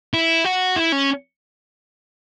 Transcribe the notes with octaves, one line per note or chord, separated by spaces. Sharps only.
E4
F#4
E4
C#4